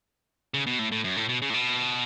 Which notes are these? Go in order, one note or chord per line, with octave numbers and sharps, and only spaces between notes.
C#3
B2
A2
A2
F#2
A2
B2
C#3
A2
B2